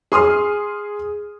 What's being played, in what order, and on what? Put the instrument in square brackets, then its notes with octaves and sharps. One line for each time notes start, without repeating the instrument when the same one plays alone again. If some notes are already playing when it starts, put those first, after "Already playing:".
[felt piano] G#4 C6 D#6 F6